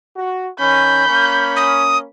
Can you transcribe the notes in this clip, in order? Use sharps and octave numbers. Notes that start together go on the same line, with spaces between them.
F#4
D#3 C#4 B5 G6
A#3 C#4
D#6